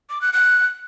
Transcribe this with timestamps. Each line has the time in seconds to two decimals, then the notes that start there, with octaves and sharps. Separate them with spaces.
0.10 D6
0.21 F#6
0.33 F#6